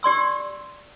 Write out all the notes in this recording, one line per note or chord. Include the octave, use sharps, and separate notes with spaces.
G4 D5 C6 E6